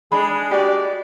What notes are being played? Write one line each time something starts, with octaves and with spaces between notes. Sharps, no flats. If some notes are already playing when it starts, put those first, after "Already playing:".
G#3 D4 G#4 B5
F#4 G4 D5